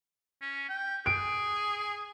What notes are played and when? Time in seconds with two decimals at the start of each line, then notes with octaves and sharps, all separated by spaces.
0.41 C#4
0.69 G5
1.06 G#4 D7